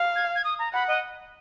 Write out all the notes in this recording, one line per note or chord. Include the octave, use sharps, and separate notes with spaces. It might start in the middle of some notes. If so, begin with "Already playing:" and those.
Already playing: F5
G#6
G#6
D#6
A#5
F#5 B5
D#5